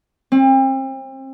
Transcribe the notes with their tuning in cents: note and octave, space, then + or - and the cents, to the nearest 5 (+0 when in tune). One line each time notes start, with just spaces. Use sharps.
C4 +35